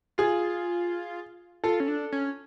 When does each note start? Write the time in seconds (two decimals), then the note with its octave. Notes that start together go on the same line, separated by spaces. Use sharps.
0.18 F4 G#4
1.64 F4 A4
1.80 C#4
1.88 D4
2.12 C#4